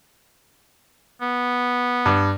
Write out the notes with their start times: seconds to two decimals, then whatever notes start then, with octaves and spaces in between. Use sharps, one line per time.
1.21 B3
2.06 G2